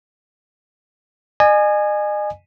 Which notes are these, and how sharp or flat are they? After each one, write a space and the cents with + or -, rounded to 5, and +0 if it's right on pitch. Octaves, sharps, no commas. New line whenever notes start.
D#5 -40 G#5 +0